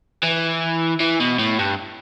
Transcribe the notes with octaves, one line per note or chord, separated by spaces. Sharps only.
E3
E3
B2
A2
G2